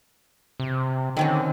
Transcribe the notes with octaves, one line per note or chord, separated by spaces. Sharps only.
C3
D3 D#3 C4 C#4